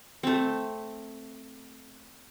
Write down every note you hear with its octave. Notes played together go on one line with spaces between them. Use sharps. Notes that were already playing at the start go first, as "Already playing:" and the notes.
A3 C4